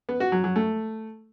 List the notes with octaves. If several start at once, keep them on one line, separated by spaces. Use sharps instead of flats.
B3
F#4
F#3
F#3
A3